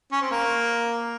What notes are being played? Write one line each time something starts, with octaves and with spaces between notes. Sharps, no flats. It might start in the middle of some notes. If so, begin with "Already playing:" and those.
C#4
C4
A#3